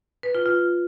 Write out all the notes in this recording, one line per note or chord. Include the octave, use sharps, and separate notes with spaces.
B4
F4
F4